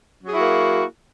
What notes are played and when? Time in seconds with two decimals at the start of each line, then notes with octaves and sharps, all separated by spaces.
0.23 F#3
0.28 G#4
0.32 E4
0.36 F#4
0.41 A#3